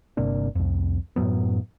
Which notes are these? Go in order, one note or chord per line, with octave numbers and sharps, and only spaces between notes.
G1 C3 A#3 D4
C2 F2
F#2 A2 F#3 B3